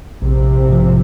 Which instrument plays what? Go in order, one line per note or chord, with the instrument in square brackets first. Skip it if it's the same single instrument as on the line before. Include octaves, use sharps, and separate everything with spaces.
[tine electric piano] A#1 [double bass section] C3
[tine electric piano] G#2 F3